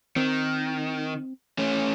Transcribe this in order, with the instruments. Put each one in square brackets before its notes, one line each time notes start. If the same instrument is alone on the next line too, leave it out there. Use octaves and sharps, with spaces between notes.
[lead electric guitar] D#3 [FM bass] C4
[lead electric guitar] A3 C#4